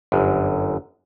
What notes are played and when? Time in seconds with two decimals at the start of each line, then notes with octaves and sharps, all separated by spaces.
0.12 G1 F#2